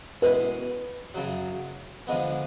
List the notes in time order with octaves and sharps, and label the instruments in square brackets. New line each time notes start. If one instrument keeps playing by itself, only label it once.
[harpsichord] B2 G#3 C#4 E4 [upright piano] B4
[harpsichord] F#2 C#3 F#3
D3 F3 G#3 B3